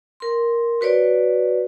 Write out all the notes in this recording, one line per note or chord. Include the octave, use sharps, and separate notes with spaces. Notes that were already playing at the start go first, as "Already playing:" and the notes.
A#4 C6
F#4 B4 C#5 D5